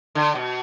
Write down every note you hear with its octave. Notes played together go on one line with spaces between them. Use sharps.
D3
B2